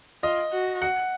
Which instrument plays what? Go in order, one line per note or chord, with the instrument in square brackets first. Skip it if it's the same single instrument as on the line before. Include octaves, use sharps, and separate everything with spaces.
[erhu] F4 [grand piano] D#5
[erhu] F#4
[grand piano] F#5